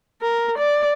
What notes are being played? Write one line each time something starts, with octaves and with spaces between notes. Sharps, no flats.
A#4
D5